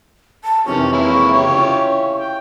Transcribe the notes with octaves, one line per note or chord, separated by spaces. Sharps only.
A5
F2 C3 D#3 E3 C#4 C#6
G#3 A#3 E4
C#3 G4 C#5
C#4 E4 F4
G5